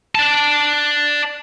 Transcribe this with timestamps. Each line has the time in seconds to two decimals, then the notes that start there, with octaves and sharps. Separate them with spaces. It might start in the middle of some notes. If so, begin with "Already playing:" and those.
0.15 D5 A5